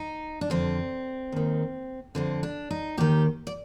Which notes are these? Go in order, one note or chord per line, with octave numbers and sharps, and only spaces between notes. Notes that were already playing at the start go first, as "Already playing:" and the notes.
Already playing: D#4
D4
F2 D3 C4
D#2 D#3
F2 D3 C4
D4
D#4
D#2 D#3 G4
D5